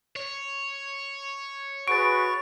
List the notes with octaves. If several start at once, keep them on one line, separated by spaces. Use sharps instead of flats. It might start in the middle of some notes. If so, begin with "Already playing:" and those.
C#5
F#4 G#4 B4 C#6 A6 D7